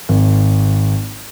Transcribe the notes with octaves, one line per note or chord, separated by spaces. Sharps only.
G#1